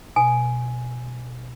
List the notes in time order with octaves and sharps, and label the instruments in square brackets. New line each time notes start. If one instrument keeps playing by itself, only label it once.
[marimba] B2 [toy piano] G#5